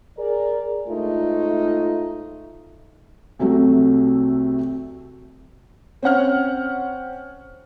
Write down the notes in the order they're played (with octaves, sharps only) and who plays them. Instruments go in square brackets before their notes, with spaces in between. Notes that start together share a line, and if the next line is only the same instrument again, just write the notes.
[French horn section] G#4 A#4 D5
G#2 A3 D#4 F4
[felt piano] C2 C3 F#3 A3
C4 C#4 F#5 F6